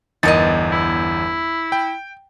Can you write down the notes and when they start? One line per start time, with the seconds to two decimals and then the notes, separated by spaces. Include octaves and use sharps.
0.23 G1 E2 D#4 A#4 D#5 A6
0.72 E4
1.72 G5